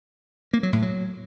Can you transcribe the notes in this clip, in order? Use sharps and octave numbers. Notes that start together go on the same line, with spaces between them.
A#3
F#3
A2
F#3